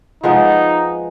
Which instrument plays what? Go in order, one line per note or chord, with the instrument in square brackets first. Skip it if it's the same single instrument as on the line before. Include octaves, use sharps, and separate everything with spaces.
[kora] F3 G#3 B3 [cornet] D#4